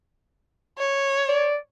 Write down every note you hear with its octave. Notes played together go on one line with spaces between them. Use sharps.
C#5
D5